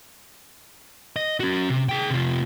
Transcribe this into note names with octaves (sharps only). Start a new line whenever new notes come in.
D#5
C#4 F#4
C3
G#4 G5
C3 F4